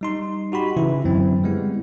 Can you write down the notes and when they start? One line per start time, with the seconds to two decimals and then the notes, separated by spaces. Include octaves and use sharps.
0.01 G3 D#4 C6
0.52 D#4 F#4 G4 B5
0.77 C#3 E3 E4
1.05 F#2 D3 F#3 B3 C4
1.44 G3 G#3 B3 E4